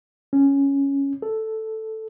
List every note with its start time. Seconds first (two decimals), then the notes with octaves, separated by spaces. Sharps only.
0.33 C#4
1.22 A4